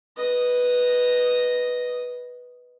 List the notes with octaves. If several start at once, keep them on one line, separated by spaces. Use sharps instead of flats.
B4 D#5